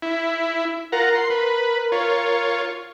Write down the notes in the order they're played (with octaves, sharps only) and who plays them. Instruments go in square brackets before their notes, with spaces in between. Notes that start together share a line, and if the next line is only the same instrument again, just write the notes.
[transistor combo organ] E4
[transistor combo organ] F4 F#5 A#5 [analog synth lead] A#4
[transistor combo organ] C6
B4
F4 C#5